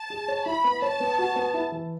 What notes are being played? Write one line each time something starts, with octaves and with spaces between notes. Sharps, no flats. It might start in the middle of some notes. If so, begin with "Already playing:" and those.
Already playing: A5
G#4
C#5
E4 B5
B3
C#5 A5
B3
F#4
B3
E4
E3